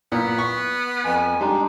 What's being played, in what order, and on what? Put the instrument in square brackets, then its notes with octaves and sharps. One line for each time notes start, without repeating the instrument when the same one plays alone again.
[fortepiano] A#2 [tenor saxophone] B3
[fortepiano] C#6
[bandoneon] F2 G#5
[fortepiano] G3 [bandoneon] G#3 D4 D#4